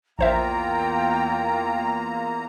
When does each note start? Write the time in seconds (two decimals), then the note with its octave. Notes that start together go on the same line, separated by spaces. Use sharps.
0.19 A#1 E2 A#3 F4 C5 E5 G5 A#5